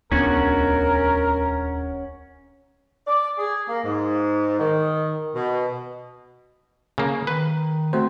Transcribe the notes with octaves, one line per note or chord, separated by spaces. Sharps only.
D#1 C#2 B3 C#4 D4 F#4 A#4
D5
G#4
A#3
G#2
D#3
B2
C#3 A#3
D#3 B4
A3 C4 F#4 C5